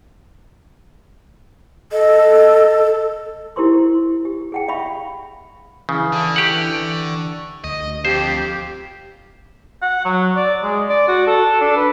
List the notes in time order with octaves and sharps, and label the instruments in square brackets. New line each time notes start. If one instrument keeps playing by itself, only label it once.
[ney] A4 [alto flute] D#5
[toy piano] E4 G4 A#4 C5 C6 C#6
G4
G#4 F#5 G5
E5 F5 G5 B5 C#6
[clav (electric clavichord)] C#3 [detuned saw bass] E3
[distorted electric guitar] D3 [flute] A5
[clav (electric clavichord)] G4 F#5 [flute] C#6
[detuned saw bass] D2 [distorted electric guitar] D#5
[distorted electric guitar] F2 [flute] G4 [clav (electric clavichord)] C5
[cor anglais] F#5
F#3
D5
G#3
D5
F#4
A4
D4
B4